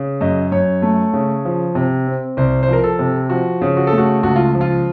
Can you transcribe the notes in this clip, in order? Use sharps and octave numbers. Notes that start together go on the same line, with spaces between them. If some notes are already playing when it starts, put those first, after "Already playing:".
Already playing: C#3
F#2 D#5
F#2 C#5
A3
C#3
F3
C3
C4
C2 C5
C5
F3 A#4
A4
C3
F3 F#4
C#3
F#4
A4
A3
F#4
C#2 F#4
F4
F3
F4